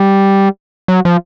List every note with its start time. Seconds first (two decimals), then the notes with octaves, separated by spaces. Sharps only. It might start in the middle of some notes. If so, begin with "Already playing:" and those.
Already playing: G3
0.88 F#3
1.05 F3